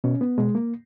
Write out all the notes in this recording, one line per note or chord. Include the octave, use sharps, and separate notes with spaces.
B2 C#4
B3
B2 G#3
A#3